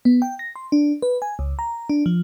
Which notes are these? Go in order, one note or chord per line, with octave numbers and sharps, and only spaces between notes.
B3
G5
A#6
C6
D4
B4
G#5
C#2
A#5
D4
F3